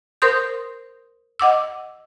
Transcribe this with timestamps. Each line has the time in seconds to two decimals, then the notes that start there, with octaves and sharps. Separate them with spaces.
0.22 A#4 C5 C6 D#6 G6
1.39 D#5 F#5 D6 E6